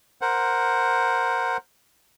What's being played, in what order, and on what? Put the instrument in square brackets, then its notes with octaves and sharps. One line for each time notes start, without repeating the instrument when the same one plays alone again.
[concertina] A#4 C5 F#5